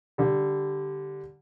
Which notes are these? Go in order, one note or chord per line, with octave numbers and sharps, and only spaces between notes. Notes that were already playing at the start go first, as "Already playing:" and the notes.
D3 G3